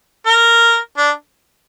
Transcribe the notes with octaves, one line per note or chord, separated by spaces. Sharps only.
A#4
D4